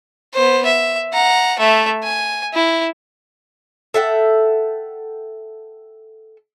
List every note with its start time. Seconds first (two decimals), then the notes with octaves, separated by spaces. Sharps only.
0.34 B3 C5
0.65 E5
1.13 F#5 A#5
1.59 A3 E5
2.03 G#5
2.54 E4
3.94 A4 E5 F#5 G5